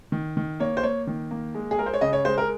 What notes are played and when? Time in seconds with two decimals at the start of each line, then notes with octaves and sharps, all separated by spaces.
0.12 D#3
0.37 D#3
0.60 A#3 C#5
0.77 C5
0.83 A#3 C#5
1.07 D#3
1.31 A#3
1.55 G#3
1.71 G#4
1.78 G#3 A#4
1.86 C5
1.94 C#5
2.01 C#3 D#5
2.13 C#5
2.25 G#3 C5
2.38 A#4